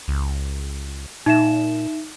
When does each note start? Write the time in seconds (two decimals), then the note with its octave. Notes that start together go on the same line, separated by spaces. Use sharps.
0.08 C#2
1.26 A#2 D#4 E5 E7